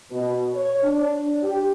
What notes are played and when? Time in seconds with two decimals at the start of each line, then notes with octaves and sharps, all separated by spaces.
0.11 B2
0.54 C#5
0.83 D4
1.43 G4